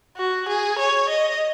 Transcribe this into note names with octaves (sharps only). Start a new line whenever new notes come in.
F#4
G#4
C#5
D#5